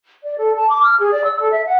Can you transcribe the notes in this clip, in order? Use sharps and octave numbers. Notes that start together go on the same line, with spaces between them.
D5
A4
A5
D6
F6
G#4
D5
E6
A4
E5
F#5